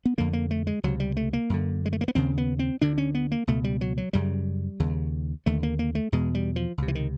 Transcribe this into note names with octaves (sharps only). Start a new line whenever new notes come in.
B3
F2 D3 A#3
A#3
A3
G#3
C#2 C3 F#3
G3
A3
A#3
F#2 D3
G#3
A3
A#3
B3
D#2 C#3 C4
B3
C4
D2 D3 D4
C#4
B3
A#3
C#2 B2 A3
G3
F#3
F#3
F#2 C#3 G3
D#2 C#3
D#2 D3 A3
A#3
A#3
A3
E2 B2 G#3
G3
F3
C#2 C3
E3
D#3